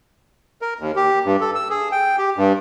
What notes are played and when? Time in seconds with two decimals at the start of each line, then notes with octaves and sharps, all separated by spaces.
0.62 A#4
0.79 D#2
0.96 G4
1.25 G2
1.41 A4
1.55 E6
1.70 G#4
1.92 G5
2.18 G4
2.36 G2